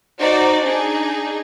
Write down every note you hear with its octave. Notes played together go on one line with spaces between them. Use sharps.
D#4 F#4 C5 D5
D4 D#4 G#4